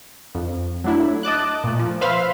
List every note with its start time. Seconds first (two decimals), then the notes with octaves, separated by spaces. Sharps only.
0.35 F2
0.84 F#3 A3 D4 E4
1.23 D#5 A5 D6 F#6
1.64 A#2 A3
1.79 F3
2.01 B4 C5 E5 F5 B5 C6